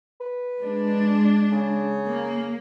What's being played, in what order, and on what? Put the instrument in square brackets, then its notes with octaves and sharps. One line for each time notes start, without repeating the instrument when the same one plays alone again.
[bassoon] B4
[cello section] G#3 D4
[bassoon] C#3
[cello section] A#3